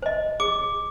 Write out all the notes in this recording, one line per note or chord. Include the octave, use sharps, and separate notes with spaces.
C5 D#5
G#4 D6